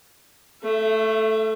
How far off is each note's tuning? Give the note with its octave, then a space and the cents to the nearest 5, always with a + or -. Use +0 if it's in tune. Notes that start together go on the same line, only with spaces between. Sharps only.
A3 +0 E5 +35